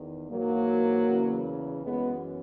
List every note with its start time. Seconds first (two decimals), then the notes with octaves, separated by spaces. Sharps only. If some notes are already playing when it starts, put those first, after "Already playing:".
Already playing: E2 D#3
0.28 G#2 E3 F#3 A#3
1.07 E2 C#3 E3
1.84 F#2 E3 G#3 B3